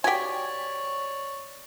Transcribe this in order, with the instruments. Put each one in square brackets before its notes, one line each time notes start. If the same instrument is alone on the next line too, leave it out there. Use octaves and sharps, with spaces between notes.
[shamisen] F#4 G5 [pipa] G4 G#5 [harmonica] C#5 D5